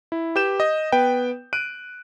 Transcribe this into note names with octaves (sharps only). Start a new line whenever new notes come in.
E4
G4 B4 G6 E7
D#5
B3 B4 G5
F#6 D7 D#7